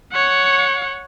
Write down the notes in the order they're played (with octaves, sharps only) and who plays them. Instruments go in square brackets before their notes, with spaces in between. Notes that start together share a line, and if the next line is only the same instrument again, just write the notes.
[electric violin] C#5 F#5